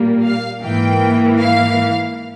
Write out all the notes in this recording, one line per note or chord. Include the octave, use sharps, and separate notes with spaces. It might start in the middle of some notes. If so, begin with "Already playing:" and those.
Already playing: A#2 G3 A#3
F5
G#2 E3 A#3 G5
F5